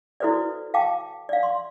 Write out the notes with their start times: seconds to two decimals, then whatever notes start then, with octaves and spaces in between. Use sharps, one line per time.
0.20 E4 F#4 A4 B4 C5 D5
0.74 F5 G5 A5 D6
1.29 D5 F5
1.43 C6